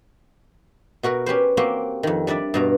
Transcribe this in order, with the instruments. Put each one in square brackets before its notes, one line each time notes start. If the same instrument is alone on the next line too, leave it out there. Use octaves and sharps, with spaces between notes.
[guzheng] B2 F#4 A#4 B4
C#4 G4 B4 C5
A#3 C4 F#4 G4 C5
F2 D#3
G3 D4 D5 E5
G2 B2 A#5